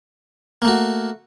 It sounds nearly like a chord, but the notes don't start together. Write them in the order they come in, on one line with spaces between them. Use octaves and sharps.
A#3 A3 F#4